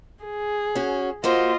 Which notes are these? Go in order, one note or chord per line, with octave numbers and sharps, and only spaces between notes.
G#4
C#4 F#4
A#3 F4 F#4 C5 D#5